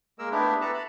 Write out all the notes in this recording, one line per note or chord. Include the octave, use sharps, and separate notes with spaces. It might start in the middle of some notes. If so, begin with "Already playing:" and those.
G#3 A#3 A#4 E6
A3 B3 D4 E4 G4
A4 B4 E5 A5 A#5
A5 B5